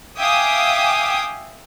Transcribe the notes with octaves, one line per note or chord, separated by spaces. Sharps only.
E5 F5 G5 G#5 D6 D#6